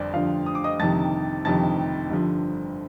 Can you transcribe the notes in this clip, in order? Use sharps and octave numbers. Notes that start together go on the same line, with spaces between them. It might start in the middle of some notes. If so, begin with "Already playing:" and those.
Already playing: G1 F2 D3 F3 D5
G1 F2 D3 F3 F4 F5
D#6
D6
D#5 D#6
G1 F2 C3 D#3 A5 A6
G1 F2 C3 D#3 A5 A6
G1 G2 D3 F3